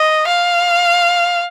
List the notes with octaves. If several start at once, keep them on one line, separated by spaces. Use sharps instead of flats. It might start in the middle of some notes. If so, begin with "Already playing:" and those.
Already playing: D#5
F5